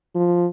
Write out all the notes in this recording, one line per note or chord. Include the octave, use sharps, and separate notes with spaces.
F3